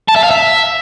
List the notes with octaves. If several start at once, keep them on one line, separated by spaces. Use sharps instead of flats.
A5
E5
F5
E5